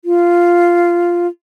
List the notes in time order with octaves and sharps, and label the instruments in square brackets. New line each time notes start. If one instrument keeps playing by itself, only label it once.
[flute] F4